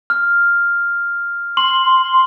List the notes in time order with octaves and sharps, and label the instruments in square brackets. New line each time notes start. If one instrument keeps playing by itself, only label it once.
[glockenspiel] F6
[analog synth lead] C6 [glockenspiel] F#7